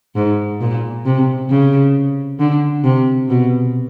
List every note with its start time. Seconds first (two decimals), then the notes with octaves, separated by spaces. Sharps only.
0.15 G#2
0.60 A#2
1.05 C3
1.50 C#3
2.39 D3
2.83 C3
3.29 B2